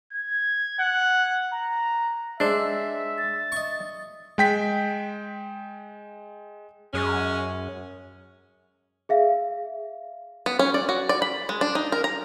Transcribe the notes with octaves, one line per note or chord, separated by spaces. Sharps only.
G#6
F#5
A#5
G#3 D4 C5 D5 E5 E6
A6
D#5 C#6
G#3 G5 B6
F#2 G#3 C#4
G#4 E5 F5
B3
C#4
D5
F#4
D5
B5
G#3
D4
D#4
A#4
A#5